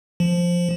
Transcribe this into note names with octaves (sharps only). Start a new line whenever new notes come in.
F3